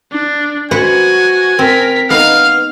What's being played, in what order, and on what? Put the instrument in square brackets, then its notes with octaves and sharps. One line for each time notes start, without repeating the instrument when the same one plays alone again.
[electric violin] D4
[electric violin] F#4 [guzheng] B4 C5 F#5 [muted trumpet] G#5
[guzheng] C4 [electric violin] A#4 B6
[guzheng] B3 D#4 [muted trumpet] F5 [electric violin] F6